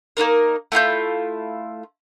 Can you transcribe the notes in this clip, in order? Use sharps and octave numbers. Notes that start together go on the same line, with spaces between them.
A#3 D4 D#4 A#4
A3 E4 F4 G6